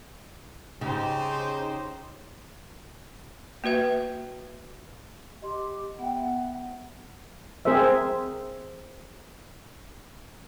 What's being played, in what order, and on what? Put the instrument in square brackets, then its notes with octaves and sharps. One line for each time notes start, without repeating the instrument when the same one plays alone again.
[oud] C#3 [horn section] D#4 [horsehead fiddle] G4 C5
[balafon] A#3 F#4 B4 E5
[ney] G4 [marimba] D#5 C6
[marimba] B3 E5 G5 [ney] F#5
[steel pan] C4 G#4 A#4 C5 E5